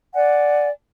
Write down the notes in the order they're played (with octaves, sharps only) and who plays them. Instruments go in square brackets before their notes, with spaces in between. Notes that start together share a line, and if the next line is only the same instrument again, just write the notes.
[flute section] D5 F#5 G#5